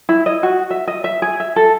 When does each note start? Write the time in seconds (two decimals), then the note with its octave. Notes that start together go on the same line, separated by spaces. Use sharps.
0.09 E4
0.26 D#5
0.43 F#4
0.70 E5
0.87 D#5
1.04 E5
1.22 G#4
1.40 E5
1.56 A4